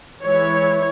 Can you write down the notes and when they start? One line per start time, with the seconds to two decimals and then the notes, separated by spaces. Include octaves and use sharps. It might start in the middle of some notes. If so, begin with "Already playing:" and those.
0.23 E3 G#3 E4 C#5